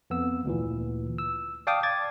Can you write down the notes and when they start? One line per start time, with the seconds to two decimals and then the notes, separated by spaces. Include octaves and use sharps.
0.10 F2 B3 E6
0.45 D2 A#2 E3
1.18 E6
1.67 D5 F5 G5 A5 D6 D#6
1.83 D6 G#6 A6